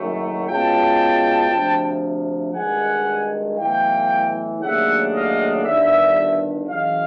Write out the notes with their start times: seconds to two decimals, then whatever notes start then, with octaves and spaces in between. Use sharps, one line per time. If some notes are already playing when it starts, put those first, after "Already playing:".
Already playing: F#1 F#2 D#3 F#3 A3
0.47 B2 G#3 C#4 F4 G5 A5
1.50 D2 C3 F3
2.53 G#1 G2 D#3 G#3 F#5 G#5
3.57 B1 A2 E3 F5 G5
4.60 D#2 C#3 F#3 A3 D4 E5 F#5
5.12 D#5 F5
5.63 G1 G2 D#3 D5 E5
6.67 F#2 C#3 E3 D#5 F5